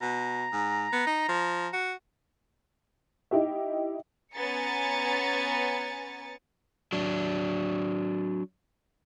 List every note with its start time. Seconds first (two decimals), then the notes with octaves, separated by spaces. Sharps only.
0.02 B2 A#5
0.52 G#2
0.92 B3
1.06 D#4
1.28 F3
1.73 F#4
3.31 D#4 E4 G4 E5
4.34 B3 C#4 G#5 A#5 A6 C#7
6.92 F#3 D4